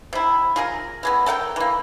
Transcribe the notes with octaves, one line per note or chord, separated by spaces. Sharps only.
C3 E4
F4 G#4 A#4
E3 G#3 B3
A4 A#4 F#5 G5
E3 A#3